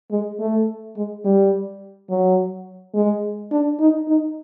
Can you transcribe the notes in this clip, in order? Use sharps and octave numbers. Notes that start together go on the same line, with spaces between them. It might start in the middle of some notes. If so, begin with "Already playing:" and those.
G#3
A3
G#3
G3
F#3
G#3
D4
D#4
D#4